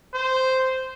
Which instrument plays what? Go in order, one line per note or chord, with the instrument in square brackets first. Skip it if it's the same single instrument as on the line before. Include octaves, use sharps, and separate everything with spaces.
[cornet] C5